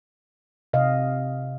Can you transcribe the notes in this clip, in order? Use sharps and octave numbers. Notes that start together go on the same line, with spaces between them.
C3 D#5 F5